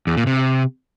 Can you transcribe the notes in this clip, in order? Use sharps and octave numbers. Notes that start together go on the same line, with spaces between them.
E2
A#2
C3